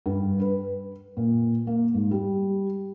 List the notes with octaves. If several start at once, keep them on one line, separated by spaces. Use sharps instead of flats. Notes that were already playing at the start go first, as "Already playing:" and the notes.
G2
B4
A#2
A#3
G#2
G3